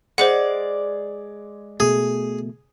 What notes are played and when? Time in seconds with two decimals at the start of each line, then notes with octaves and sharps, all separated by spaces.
0.18 G#3 C5 D5 F#5
1.80 B2 A3 G#4